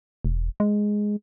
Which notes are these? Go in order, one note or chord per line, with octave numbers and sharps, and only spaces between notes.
E1
G#3